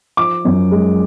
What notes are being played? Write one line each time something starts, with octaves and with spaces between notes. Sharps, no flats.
F3 D6
F#2
G#3